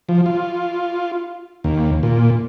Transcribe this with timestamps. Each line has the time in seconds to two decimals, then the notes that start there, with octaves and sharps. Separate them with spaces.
0.09 F3
0.26 F4
1.64 D#2
2.03 A#2